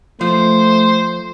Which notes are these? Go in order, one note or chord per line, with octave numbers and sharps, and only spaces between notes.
F3 A3 C5